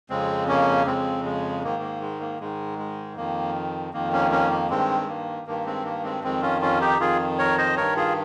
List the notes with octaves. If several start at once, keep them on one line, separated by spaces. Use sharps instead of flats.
F2 C#3 G#3 C4
A#3 C#4
F2 C#3 G#3 C4
G#3
G#2 D#3 A#3
A#3
G#3
A#3
G#2 D#3 G#3
G#3
F2 D#3 A#3
F2 D#3 A#3
A#3 C#4
A#3 C#4
A#3
G2 D#3 G#3 C4
G#3
A#3
G2 D#3 A#3
G#3 C4
A#3
G#3 C4
F2 D#3 G#3 C4
C#4 F4
C#4 F4
D#4 G4
F2 D#3 F4 G#4
A#4 C#5
C5 D#5
G2 D#3 A#4 C#5
F4 G#4